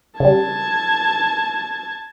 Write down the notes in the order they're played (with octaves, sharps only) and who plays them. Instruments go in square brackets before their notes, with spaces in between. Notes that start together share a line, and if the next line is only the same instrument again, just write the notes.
[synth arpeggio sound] C#3 G3 [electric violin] A5 G#6